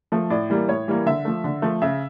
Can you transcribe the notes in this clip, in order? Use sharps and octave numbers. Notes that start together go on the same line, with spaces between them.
F3 A3
A2 D5
E3 G3 A#3
A2 C#5
E3 G3 A#3
D3 E5
F3 A3
D3
F3 A3
C#3 E5